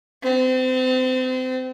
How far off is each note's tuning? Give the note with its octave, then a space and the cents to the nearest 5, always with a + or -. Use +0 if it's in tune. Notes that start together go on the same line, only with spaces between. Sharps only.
C4 -30